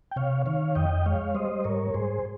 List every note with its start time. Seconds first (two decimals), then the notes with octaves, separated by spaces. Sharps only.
0.12 G5
0.16 C3 C#5 F5
0.46 D#3 C#5 F5
0.75 F2 D#5 G5
1.06 G#3 C#5 F5
1.34 G3 C5 D#5
1.64 G#2 A#4 C#5
1.94 G#2 G#4 C5